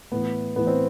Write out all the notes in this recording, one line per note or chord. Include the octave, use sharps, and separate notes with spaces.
A2 E3 B3
A2 E3 B3
C4